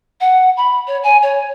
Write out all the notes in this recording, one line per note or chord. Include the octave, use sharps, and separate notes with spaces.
F#5
B5
C#5
G#5
C#5